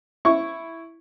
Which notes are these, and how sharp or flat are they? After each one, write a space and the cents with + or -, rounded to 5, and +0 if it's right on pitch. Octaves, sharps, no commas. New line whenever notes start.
E4 +0 C#6 +0